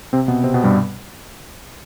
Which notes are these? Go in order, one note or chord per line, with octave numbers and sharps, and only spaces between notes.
C3 C4
B2 B3
C3 C4
B2 B3
G2 G3